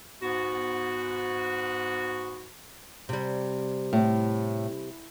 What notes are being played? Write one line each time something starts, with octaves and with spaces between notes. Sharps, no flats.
G#2 B3 F#4
C3 G3
A2